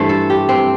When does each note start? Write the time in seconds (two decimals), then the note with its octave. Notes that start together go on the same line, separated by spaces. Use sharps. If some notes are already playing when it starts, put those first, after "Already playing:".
Already playing: G2 E3 A3 C5
0.09 A4
0.30 G4
0.49 C4